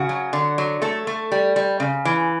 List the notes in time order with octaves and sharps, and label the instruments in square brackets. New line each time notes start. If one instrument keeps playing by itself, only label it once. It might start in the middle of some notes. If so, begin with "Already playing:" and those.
Already playing: [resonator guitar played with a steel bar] C#3 F#4
F#3
D3
F#3
A3 A4
A3
G3
G3
C#3
E3